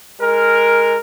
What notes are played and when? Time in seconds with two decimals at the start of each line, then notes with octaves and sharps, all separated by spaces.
0.19 G#3 A#4